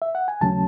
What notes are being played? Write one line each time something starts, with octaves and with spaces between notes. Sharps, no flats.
E5
F#5
G#5
D#2 C#3 F#3 A3 C#4 A5